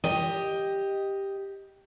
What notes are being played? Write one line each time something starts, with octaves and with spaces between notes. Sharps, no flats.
G4 D#5